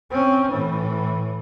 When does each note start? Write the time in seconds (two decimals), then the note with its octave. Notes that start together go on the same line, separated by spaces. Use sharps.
0.10 C4 C#4
0.51 A2 E3